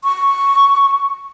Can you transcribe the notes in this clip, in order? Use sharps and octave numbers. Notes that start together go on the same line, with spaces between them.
C#6